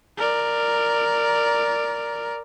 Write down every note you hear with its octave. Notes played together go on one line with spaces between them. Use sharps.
A#4 D5